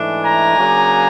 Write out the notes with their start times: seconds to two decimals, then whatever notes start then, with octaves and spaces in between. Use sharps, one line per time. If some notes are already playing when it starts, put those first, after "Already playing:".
Already playing: G#2 E3 A3 D4
0.23 G#5 A#5
0.58 C#3 F#3 A#3 D4